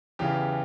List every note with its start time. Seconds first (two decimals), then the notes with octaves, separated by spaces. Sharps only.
0.19 E2 C#3 E3 G4